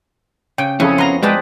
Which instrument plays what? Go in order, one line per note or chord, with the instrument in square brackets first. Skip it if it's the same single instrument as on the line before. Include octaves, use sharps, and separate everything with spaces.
[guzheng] C#3 [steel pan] G5
[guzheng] F2 [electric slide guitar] C#4 [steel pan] E4 G#4 A4
[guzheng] B3 F5 [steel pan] A#5 C6
[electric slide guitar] G#3 [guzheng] C4 G4 A5 [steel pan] G#4 B4 D5